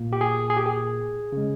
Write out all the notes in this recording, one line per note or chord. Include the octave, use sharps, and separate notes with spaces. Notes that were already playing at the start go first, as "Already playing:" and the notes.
Already playing: A#2 A#3
G4
G#4
G#4
G4
G#4
C#3 G#3